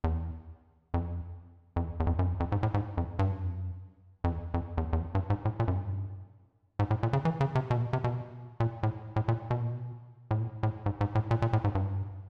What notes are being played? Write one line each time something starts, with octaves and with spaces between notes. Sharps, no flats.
E2
F2
F2
E2
E2
F2
F#2
F2
F2
G#2
A2
G#2
F2
G2
F#2
F2
F#2
F2
E2
F2
E2
E2
F2
G2
G#2
A2
A#2
F#2
G2
G#2
A2
A#2
C#3
E3
C#3
C3
B2
A#2
B2
C3
B2
A#2
A2
A2
A#2
B2
A#2
B2
A2
A#2
A2
G#2
G#2
A2
A#2
A#2
A2
G#2
G2